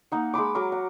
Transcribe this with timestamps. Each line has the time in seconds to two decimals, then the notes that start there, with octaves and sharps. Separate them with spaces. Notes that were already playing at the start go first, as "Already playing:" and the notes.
0.12 A#3 D#4 F#5
0.34 G#3 B4 B5 D6
0.55 F#3 A#4 D6
0.72 F#5